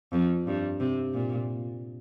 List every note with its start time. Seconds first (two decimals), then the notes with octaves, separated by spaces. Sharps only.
0.13 F2
0.47 G2
0.80 C3
1.14 A#2